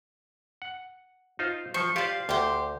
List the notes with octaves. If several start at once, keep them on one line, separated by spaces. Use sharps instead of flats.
F#5
D#4 F4 C5
F3 C5 C#6
F4 G4 C5 D5 F5
D2 G4 C5